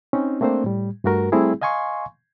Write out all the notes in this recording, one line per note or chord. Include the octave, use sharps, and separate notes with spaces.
C4 C#4 D#4
A3 A#3 C4 D4 C5
A2 G3
G2 A3 F#4 A#4
G3 A3 C4 E4 G#4
D#5 F5 G#5 C6 C#6